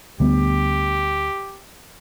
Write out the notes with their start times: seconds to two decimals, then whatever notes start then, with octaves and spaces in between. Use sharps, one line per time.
0.20 D2 G3 B3 G4